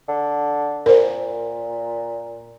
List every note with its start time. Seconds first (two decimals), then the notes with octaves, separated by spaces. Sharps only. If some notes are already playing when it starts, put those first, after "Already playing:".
0.08 D3
0.86 A#2 A#4 C5